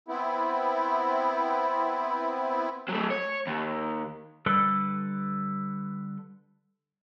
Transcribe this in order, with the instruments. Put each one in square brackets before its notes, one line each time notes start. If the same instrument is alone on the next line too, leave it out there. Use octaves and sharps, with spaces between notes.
[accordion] B3 C4 E4
[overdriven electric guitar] F#3 A3
C#5
D#2
[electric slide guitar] D3 G3 A4 B4